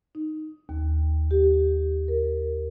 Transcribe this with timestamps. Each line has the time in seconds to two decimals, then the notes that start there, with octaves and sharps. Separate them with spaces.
0.15 D#4
0.69 D#2
1.31 G4
2.08 A#4